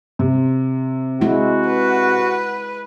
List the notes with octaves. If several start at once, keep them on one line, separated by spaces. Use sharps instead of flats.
C3
G#3 E4 F#4
B4